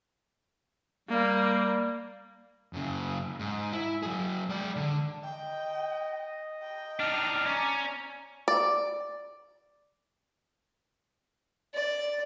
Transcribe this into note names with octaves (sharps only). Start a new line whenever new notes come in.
G3 A#3
F#2 C#3
G#2
E4
F#3 G#4
G#3 D5
D3
D#5 G5
G5
D4 D#4 F6
C#4 D5 A#5
D5
D5